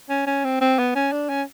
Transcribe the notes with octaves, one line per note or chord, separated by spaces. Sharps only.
C#4
C#4
C4
C4
B3
C#4
D4
C#4